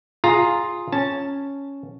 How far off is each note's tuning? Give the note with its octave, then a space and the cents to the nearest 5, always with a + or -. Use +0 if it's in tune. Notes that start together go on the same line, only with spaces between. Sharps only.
F4 +0 G#4 +0 A#5 +0
C#4 +0 A5 +0